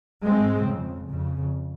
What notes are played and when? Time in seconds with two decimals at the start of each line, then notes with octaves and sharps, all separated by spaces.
0.24 G#2 G#3 C4
0.67 F2 C#3
1.08 F2 C#3